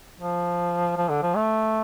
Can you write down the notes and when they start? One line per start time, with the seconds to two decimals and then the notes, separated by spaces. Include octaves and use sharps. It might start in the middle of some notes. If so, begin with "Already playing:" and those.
0.20 F3
0.97 F3
1.09 D3
1.22 F3
1.35 A3